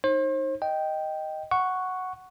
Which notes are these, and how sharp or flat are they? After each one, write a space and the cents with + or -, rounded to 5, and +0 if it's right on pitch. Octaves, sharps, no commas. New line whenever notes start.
D#4 +0 C5 +40
D#5 +0 G5 -5
F#5 +0 C#6 +0